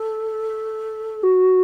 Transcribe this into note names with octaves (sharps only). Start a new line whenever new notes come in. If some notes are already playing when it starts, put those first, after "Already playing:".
Already playing: A4
F#4